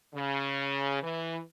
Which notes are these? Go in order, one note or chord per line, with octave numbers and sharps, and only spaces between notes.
C#3
E3